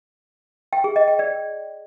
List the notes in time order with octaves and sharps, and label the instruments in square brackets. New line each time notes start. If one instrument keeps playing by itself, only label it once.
[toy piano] G5
G#4
D#5
G5
D5